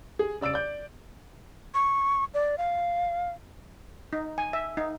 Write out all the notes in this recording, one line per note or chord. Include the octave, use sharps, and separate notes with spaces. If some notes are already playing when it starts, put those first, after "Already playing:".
G#4
C#3 D5 E6 A6 D7
D5 G6
C#6
D5
F5
D#4
G#5
E5
D#4